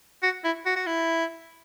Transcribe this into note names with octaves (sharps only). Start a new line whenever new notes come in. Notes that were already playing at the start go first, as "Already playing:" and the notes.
F#4
E4
F#4
F#4
E4